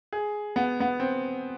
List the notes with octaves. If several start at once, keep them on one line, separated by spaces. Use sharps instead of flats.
G#4
B3
B3
C4